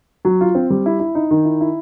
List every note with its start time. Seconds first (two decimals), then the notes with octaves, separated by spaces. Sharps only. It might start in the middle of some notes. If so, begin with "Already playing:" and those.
0.25 F#3
0.41 F4
0.55 C4
0.70 G3
0.86 E4
1.00 E4
1.15 D#4
1.31 D#3
1.45 E4
1.61 E4